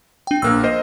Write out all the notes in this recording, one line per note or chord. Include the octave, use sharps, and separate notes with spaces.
D4 G5
A#1 A#3 A#4 E6 F#6
A#4 C5 D#5